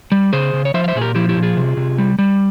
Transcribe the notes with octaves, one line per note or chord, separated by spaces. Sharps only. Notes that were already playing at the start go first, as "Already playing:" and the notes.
G3
C#3 G#4 C5
C#3
C#5
F3 C5 E5
F5
C5 E5
A#2 G#4
G4 A#4
F3 E4 G4
E4 G4
A#2
F4 G#4
C3
C3
G3
G3